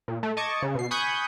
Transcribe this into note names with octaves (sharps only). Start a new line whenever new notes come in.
A#2
A3
D#5 A5 C#6 D6 G#6 C#7
C#3
B2 C7
G#5 B5 C#6 D#6 F#6 G6